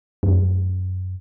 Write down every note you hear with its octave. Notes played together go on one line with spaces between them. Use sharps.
F#2